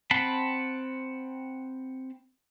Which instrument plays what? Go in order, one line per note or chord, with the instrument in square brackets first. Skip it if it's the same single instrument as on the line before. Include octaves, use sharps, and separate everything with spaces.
[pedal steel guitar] C4 F#5 A5 B5